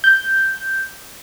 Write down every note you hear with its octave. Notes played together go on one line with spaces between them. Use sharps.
G6